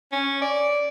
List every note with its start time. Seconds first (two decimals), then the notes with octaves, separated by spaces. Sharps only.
0.12 C#4
0.42 D5